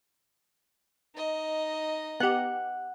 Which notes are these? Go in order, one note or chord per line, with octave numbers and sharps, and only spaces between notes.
D#4 D#5
B3 G4 F#5